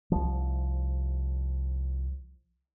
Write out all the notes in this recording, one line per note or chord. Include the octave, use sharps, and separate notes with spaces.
C2 F3